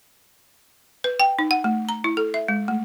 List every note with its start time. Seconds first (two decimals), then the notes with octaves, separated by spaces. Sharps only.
1.04 B4
1.20 G5
1.39 D#4
1.51 F#5
1.64 A3
1.89 A#5
2.04 E4
2.17 A4
2.34 E5
2.48 G#3
2.68 A3